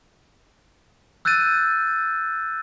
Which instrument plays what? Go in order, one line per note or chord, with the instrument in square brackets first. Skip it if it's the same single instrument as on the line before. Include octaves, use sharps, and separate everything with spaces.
[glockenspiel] E6 F#6 G6 A6 D#7